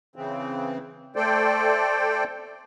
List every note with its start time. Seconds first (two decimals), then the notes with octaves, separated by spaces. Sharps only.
0.16 C#3 E3 C4
1.16 A3 A4 C5 D5 G5